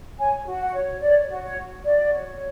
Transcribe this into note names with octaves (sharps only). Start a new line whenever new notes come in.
C#5 G#5
F#4
F#5
C#5
C#5 D5
F#4
C#5
F#4
F#4 D5
C#5